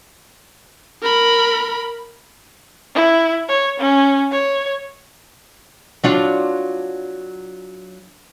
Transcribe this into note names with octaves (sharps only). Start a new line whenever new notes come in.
A#4 B5
E4
C#5
C#4
C#5
F#3 D4 F4